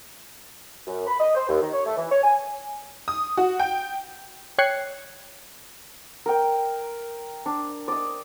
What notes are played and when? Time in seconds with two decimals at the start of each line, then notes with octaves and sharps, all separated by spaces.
0.86 F#2
1.07 B5
1.20 D#5
1.35 C5
1.48 D#2
1.61 D#3
1.72 C#5
1.86 A3
1.97 E3
2.11 C#5
2.23 G#5
3.08 D#6
3.37 F#4
3.59 G5
4.58 C#5 G5 F#6 G#6 C7 C#7
6.26 A#4 G5
7.46 D4
7.88 D5 D#5